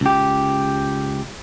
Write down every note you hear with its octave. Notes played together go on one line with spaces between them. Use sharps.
C#2 G4